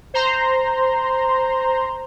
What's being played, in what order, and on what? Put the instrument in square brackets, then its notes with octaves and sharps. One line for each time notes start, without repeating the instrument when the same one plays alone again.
[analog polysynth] C5 A#5 C6